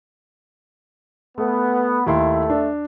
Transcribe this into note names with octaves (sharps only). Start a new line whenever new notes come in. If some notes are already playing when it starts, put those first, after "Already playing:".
A3 B3
D#2 A3 E4 C6
D4